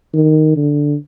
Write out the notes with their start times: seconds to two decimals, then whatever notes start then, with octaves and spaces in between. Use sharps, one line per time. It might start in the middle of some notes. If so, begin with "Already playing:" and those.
0.14 D#3
0.56 D3